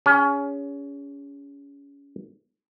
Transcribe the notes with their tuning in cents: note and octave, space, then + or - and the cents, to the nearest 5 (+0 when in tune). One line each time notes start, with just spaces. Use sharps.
C#4 +25 G#4 -25